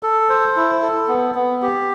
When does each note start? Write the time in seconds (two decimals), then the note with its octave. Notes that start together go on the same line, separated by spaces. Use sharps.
0.03 A4
0.29 C5
0.56 E4
0.82 A4
1.08 B3
1.35 B3
1.62 G4